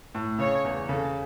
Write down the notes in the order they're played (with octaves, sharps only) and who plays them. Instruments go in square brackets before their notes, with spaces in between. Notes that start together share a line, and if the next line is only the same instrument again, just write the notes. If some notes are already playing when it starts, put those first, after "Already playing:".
[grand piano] A2
[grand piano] C#3 [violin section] C#5
[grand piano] E2
[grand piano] C#3 [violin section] A4